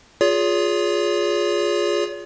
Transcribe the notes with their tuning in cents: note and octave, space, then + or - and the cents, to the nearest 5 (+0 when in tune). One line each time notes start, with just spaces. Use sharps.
F4 +15 G#4 +0 C#5 +45